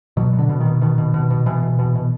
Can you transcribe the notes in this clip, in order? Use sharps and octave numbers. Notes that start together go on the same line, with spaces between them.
B2 F#3
B2
D3
B2
D#3
B2
B2 D#3
B2
B2
B2
B2 E3
B2
B2
B2